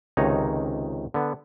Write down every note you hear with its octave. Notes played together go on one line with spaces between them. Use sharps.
C#2 C3 D#3 D#4 C#5 A#5
D3 B3